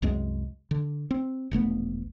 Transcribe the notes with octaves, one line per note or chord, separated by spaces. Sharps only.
C2 F#2 G#3
D3
C4
E1 A#1 A3 B3